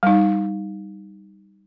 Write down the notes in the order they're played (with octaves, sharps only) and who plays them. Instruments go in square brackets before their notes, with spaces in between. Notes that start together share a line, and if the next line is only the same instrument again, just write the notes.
[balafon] G3 D#4